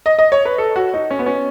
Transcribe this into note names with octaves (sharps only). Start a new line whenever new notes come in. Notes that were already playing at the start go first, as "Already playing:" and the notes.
D#5
D#5
C#5
B4
A4
F#4
D#4
C#4
B3
C#4